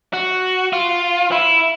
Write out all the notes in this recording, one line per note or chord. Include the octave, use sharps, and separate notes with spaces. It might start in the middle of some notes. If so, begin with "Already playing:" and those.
F#4
F4
E4